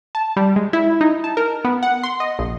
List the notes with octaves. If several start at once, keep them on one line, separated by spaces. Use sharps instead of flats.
A5
G3
G#3
E4
D#4
A5
A#4
B3
F#5
C6
D#5
A#1